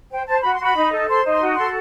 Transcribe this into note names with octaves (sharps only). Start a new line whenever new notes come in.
C5 G5
C5 A5
F#4 B5
C6
F#4 B5
D#4
A4
C5 C6
D#4
C6
F#4
A4 C6